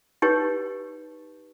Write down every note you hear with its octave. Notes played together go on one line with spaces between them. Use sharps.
D#4 G4 B4 C#5